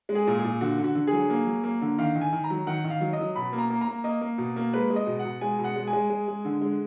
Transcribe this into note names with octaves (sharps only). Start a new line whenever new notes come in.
G#3
G#4
A#2
G#4
A#2
D3 F#4
D3
F#4
D3
F#3 G#4
A#3
F#3
A#3
D3
D#3 F5
D#3
G#5
D#3
A#5
F#3
D#3 F#5
D#3
F5
F#3
D#5
F#3
B2 B5
A#3
A#5
A#3
A#5
A#3
A#3 D#5
A#3
B2
A#3
G#3 B4
G#3
D#5
B2
F#5
B2
G#3 G#5
B2
F#5
G#3
G#5
G#3
G#3
G#3
D3
G#3